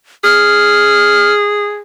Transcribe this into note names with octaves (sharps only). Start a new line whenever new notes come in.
G#4 F6